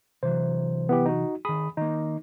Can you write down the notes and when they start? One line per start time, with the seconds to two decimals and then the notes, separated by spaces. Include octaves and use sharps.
0.23 C3 E3 F#3 C5
0.89 B3 E4 G4
1.06 D#4 F#4
1.45 D#3 G#4 B5 D#6
1.77 D#3 A#3 D#4